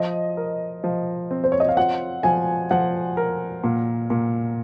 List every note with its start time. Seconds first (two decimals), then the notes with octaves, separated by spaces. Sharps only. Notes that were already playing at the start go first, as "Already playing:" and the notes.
Already playing: F3 D#5
0.37 A#4
0.84 F3
1.31 C4
1.44 C5
1.52 C#5
1.60 D#5
1.69 F5
1.76 F4 F#5
2.23 F3 G#5
2.71 F3 F#5
3.17 A#4
3.64 A#2
4.10 A#2